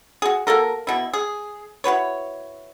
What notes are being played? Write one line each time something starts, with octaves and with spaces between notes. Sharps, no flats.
F#4 G#4
A#3 F#4 A4 A#4
B2 E4
G#4
E4 F#4 B4 C#5